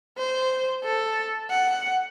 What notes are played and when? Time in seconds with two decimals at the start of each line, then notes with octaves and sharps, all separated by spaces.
0.18 C5
0.84 A4
1.50 F#5